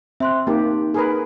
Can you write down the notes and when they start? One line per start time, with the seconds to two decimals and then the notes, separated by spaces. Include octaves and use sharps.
0.20 C4 E5 C6 F#6
0.47 A#3 D#4 G4
0.94 G#4 A#4 B4